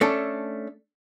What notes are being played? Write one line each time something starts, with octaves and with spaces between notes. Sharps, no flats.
A3 C#4 D4 A4